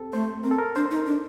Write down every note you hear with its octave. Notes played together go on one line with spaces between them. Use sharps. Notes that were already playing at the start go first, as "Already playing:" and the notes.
Already playing: C4 G4 A4
A3 C5
C4 A#4
A4
A#4
D4 C5
C5
D#4
A#4
D4